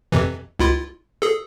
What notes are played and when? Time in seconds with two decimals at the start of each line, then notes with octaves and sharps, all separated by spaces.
0.12 F2 C3 E3
0.59 C#2 E4 F4
1.22 G#4 A4